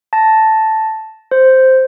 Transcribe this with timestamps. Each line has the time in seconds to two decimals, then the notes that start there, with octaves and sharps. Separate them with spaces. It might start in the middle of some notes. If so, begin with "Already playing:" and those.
0.13 A5 A#6
1.31 C5